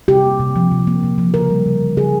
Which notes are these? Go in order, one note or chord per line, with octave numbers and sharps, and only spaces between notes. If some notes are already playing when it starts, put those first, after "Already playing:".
C3 G4
A#3
C3
F3
C3
A#3
C3
F3
C#3 A#4
G3
C#3
E3
C#3 G#4